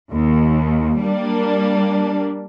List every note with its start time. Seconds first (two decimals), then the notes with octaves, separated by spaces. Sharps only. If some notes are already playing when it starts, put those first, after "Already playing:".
0.13 D#2
1.00 G3 A#3 D4